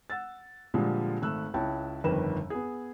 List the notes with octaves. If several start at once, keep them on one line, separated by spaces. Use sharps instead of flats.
F#5 E6 A6
A#2 D3 F3 G3 G#3
G#1 A3 E6 F#6
C#2 E4 C#5 G5 A5
G1 F2 D#3 A#4 B4 E7
B3 G#4